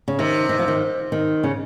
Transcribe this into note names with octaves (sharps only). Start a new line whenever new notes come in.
C#3
C3 D#3
D#3
F3
D#3
D#3
C#3